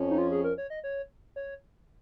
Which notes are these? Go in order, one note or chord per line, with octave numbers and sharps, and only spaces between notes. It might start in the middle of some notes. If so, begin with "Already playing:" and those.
Already playing: F2 F3 C#4
D#4
F4
G#4
A#4
C#5
D#5
C#5
C#5